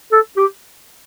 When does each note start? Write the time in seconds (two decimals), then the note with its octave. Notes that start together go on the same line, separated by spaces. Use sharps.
0.12 A4
0.37 G4